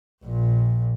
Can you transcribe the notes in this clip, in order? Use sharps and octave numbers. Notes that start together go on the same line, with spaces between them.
A#1 A#2